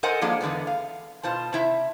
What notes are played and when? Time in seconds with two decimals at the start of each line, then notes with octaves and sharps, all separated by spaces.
0.03 A4 A#4 C5 D#5 F#5 G#5
0.21 F3 G#3 A#3 D4
0.41 E2 D3 G#3 B3
0.67 F5
1.23 B2 F4 C5 A5
1.53 C3 E4 E5